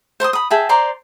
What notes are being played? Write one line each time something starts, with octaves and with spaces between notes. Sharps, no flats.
C5 C6 C#6 D#6
B5 D#6
G#4 E5 G5 A5
C5 D5 A#5 C6